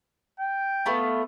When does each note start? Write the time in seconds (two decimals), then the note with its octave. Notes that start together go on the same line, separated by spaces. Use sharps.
0.39 G5
0.86 A3 B3 F4